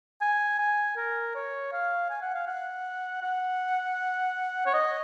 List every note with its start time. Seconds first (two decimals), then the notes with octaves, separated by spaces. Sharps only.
0.22 G#5
0.59 G#5
0.96 A#4
1.35 C#5
1.72 F5
2.10 G#5
2.22 F#5
2.34 F5
2.47 F#5
3.22 F#5
4.66 C#5
4.74 D#5